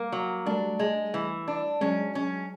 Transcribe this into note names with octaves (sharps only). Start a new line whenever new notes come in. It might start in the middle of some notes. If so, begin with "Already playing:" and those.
Already playing: G3 A3 A#3
F#3
G3 A3 D4
G#3
E3
D4
F#3 G#3 C#4
C#4